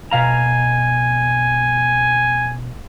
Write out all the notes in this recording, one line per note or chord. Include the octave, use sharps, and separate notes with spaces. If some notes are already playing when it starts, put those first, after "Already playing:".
B2 F5 G#5 A#5